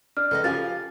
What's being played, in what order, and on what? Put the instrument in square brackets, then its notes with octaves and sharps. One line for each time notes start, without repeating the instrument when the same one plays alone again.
[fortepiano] D4 [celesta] F6
[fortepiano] C#2 [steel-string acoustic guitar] A4 B4 D#5
[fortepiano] C#3 F3 G4 [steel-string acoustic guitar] F5 G#5 [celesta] A6